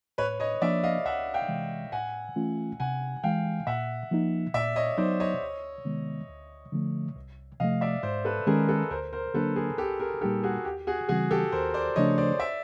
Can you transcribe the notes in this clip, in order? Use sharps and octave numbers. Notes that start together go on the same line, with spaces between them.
A2 B4 C#5
C#5 D#5
F3 A#3 D4 D5 E5
D#5 F5
C#2 E5 F#5
F5 G5
C3 E3 G#3
A2 F#5 G#5
E3 A3 C#4 F4
C3 F#5 G#5
E3 G#3 F5 G5
A#2 E5 F#5
F3 A#3 D#4
A#2 D5 E5
C#5 D#5
F#3 B3 D#4 C5 D5
C#5 D#5
D2
C3 D#3 G#3 B3
D2
D3 F3 A3
C2
C3 F3 A3 D#5 F5
D5 E5
G#2 C5 D5
A4 B4
D#3 G#3 C#4 G#4 A#4
A4 B4
D2 A#4 C5
A#4 C5
D3 F#3 A#3 D4 A4 B4
G#4 A#4
C2 G4 A4
G#4 A#4
A#2 G3 A#3 D#4 G4 A4
F#4 G#4
D#2 G4
F#4 G#4
C#3 E3 G3 C4 F#4 G#4
G4 A4
D#2 A#4 C5
C5 D5
C#3 F3 A3 D4 C#5 D#5
C5 D5
D5 E5